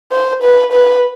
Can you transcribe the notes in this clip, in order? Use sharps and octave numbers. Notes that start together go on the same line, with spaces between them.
C5
B4
B4